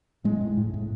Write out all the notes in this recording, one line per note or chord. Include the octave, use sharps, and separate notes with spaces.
A2 G#3
A2
A2
A2